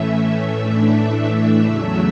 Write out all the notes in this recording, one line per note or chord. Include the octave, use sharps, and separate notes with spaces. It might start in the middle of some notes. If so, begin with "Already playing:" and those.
Already playing: A2 E3 A3 C#4 E5
A2 E3 A3 D4
E2 C#3 F#3 A3 E5